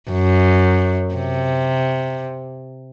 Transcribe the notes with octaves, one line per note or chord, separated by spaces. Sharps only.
F#2
C3